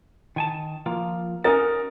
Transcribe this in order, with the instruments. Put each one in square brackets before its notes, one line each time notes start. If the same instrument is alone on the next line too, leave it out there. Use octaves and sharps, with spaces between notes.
[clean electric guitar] D#3 G#5 A5
F3 A#3 F4
[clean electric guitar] C#4 D#4 F#4 [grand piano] A#4 A6